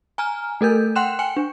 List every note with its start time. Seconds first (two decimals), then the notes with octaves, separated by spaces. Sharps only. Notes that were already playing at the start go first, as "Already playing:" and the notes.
0.18 G#5 A#5 F6
0.61 A3 A4 A#4 G6
0.96 F#5 G5 C6 F#6 E7
1.19 G5 G#5 C#7
1.37 D4